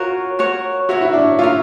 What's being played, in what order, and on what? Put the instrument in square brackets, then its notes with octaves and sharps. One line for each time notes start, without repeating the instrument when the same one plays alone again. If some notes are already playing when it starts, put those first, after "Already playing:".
Already playing: [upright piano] F4 [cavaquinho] F#4 A#4 C#5
[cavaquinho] F#4 A#4 C#5
[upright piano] F#4 [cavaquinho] A#4 C#5 E5
[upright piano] E4
D4
[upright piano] F4 [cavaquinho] A#4 C#5 E5